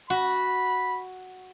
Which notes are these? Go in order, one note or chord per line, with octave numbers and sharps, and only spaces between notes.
F#4 B5